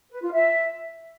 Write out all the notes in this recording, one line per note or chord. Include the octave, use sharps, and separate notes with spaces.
B4
F4
E5